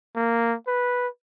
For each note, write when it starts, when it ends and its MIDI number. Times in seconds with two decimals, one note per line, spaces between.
0.16 0.55 58
0.67 1.08 71